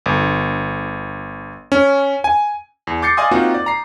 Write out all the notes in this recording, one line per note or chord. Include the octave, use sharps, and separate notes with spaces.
G1
C#4
G#5
E2
D6 G6 A6 C7 C#7
D5 D#5 F5 G#5 C6 D#6
A#3 C4 D#4 F4 F#4
D5
A#5 C7